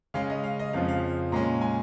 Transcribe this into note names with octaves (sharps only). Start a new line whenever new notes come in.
C#3 G#3 C#4 F5
D#5
F5
D#5
F2 C#3 F3 F5
F5
A#2 G#3 C#4 A#5
G#5